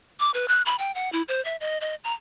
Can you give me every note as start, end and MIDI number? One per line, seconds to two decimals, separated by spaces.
0.20 0.31 86
0.34 0.48 71
0.48 0.62 90
0.66 0.76 83
0.79 0.94 79
0.95 1.11 78
1.12 1.22 64
1.28 1.43 72
1.45 1.56 76
1.61 1.78 75
1.81 1.95 75
2.04 2.14 82